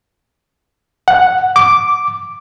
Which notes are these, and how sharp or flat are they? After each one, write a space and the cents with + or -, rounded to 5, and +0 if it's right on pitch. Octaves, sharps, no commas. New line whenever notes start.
F#5 +0
D6 -5